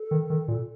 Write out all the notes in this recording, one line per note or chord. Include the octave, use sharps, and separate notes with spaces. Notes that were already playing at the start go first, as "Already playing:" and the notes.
Already playing: A4
D#3
D#3
A#2